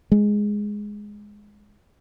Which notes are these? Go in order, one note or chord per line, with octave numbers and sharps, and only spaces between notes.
G#3